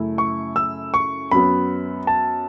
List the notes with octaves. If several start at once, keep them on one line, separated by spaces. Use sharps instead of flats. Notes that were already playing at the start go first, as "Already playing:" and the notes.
Already playing: F#2 C#3 A3 E4
C#6
E6
C#6
F#2 F#3 B3 B5
A5